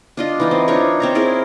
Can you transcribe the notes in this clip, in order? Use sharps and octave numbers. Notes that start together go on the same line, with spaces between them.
D4 F4 D#5
E3 D#4 F4
C4
D4 D#4 F4 C#5
C4 C#5 A#5
E4 G#4 A#4